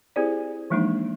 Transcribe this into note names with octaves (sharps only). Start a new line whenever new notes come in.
C4 E4 G4 G#4 C5 D5
E3 F3 G#3 A#3 D4 D#4